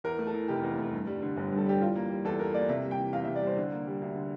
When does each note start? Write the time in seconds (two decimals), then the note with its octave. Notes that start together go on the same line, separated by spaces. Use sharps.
0.04 E2 A#4
0.19 A3
0.27 A4
0.35 E3
0.48 F1 G4
0.63 E2
0.78 A3
0.93 G2
1.07 G3
1.22 D3
1.37 G1
1.52 G2
1.57 A4
1.66 G3 G4
1.81 E3 F4
1.96 A#3
2.10 G3
2.25 E2 A4
2.39 E3 A#4
2.54 A#3 D5
2.69 C3 E5
2.84 G3
2.91 G5
2.98 E3
3.13 E2 F5
3.24 C3 E5
3.36 D5
3.42 G3 C5
3.57 D3
3.72 A#3
3.87 G3
4.02 D2
4.15 D3